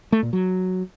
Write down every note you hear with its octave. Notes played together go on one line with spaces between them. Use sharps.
A3
A#2
F#3